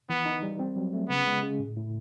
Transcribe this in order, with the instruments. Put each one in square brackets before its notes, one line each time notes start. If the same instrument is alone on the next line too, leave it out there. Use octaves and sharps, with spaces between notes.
[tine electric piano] E3 [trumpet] B3
[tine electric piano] D#4
G3
C4
F#3
A3
[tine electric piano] C#3 [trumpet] B3
[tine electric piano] G#3
C#3
A2
A2